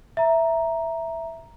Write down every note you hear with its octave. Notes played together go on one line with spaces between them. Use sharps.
E5 A#5